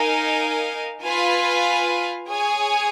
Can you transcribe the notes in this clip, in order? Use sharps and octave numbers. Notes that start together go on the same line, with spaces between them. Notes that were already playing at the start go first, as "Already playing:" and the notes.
Already playing: D#4 A#4 F5 G#5
F4 B4 F5 G#5
G#4 C#5 G#5